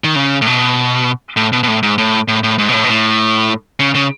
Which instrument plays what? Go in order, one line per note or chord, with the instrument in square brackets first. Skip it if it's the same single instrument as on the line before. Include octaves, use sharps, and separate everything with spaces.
[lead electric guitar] D#3
C#3
A2
B2
A2
B2
B2
A2
G#2
A2
A2
A2
G#2
B2
A2
B2
A2
C#3
C#3